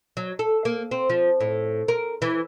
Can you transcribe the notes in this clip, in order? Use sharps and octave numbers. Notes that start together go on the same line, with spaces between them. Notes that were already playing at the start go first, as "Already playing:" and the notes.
F#3
A4
A#3
C4
F3
A2
A#4
E3